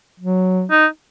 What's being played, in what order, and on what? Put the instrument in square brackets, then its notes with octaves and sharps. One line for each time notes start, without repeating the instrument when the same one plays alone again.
[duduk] F#3
[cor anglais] D#4